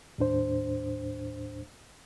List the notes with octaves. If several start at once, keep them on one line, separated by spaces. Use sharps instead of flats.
D#2 A2 D4 C5